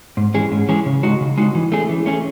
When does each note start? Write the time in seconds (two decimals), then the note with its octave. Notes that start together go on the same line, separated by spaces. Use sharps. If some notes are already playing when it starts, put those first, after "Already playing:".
0.17 G#2
0.34 E3 G#3 C#4 G#4
0.52 G#2
0.69 E3 G#3 C#4 G#4
0.86 C#3
1.03 G#3 D#4 F#4
1.21 C#3
1.38 G#3 D#4 F#4
1.55 E3
1.72 A3 C#4 G#4
1.89 E3
2.06 A3 C#4 G#4